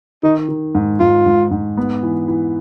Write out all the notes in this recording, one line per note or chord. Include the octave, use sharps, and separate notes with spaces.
D#3 D#4
D#3
G#2
G#2 F4
G#2
G#2
B3
E3
E3